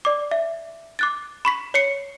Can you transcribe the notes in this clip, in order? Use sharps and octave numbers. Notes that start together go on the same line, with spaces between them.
D5 D6
E5
D6 F#6 A6
B5 C#6 B6
C#5 C7 C#7